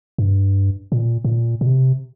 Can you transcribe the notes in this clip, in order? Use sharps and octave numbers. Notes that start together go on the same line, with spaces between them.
G2
A#2
A2
A#2
A#2
C3